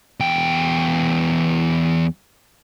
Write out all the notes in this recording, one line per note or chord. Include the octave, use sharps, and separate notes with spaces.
E2 G5